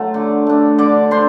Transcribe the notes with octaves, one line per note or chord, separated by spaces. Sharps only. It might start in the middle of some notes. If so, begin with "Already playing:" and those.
Already playing: F#3 A3 C5 C6
D3
A3 D4
D3 D5 D6
D4 C5 C6